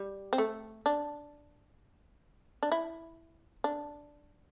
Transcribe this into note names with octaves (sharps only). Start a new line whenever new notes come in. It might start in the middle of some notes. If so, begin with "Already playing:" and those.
Already playing: G3
C4
A3
D4
D4
E4
D4